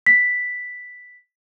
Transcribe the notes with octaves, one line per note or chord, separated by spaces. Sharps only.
B6